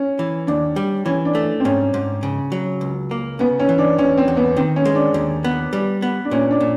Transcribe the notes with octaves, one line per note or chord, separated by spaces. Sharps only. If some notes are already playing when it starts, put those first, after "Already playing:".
Already playing: C#4
E3
D#2 D4
G3
E3 C#4
D4
A3
C4
G#2 C#4
G#2
C#3
F#3
C#2
A#3
C#3 B3
C#4
E3
D4
E2 C#4
C4
E2
B3
D#3 C4
C#4
G#3
D4
D#2
B3
G3
B3
D4
A#2 C#4
D4
A#2